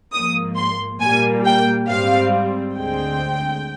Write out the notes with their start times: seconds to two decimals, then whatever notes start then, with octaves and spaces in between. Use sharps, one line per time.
0.13 G#2 F3 A#3 D#6
0.57 C6
1.00 A#2 G3 A#3 G#5
1.45 G5
1.89 G#2 G3 C4 F5
2.77 D2 D3 G#3 C4 G5